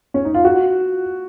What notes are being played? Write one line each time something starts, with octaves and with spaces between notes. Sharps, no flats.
C#4
D#4
F4
F#4